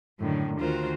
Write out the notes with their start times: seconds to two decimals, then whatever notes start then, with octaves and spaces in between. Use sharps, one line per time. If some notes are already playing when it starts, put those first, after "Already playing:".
0.19 F#2 A2 D3 D#3
0.59 D2 D#3 F4 F#4 A#4 C5